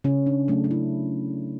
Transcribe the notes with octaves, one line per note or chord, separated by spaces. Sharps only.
C#3 C#4
D4
F#3 A3 D4
D4
E4